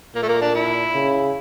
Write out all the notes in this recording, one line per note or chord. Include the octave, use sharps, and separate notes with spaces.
A#2 A#3
A3
A#3
D4
E4
C#3